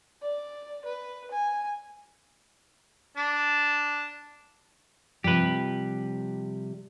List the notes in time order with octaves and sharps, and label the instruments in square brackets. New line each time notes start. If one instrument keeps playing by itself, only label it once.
[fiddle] D5
B4
G#5
[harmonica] D4 A5
[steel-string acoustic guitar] C3 F3 G3 [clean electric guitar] G4 B4